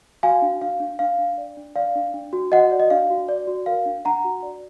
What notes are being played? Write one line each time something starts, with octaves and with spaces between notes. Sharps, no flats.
F#4 F5 G#5
D4
D4 F5
D4
D4 F5
D4
D5
D4
D5 F5
D4
D4
F#4
F#4 D#5 F#5
D5
D#5
D4 F5
F#4
D5
F#4
A#4 F5
D4
D4 F#5 A#5
F#4
D5